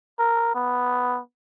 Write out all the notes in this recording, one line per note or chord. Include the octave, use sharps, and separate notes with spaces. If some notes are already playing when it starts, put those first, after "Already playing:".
A#4
B3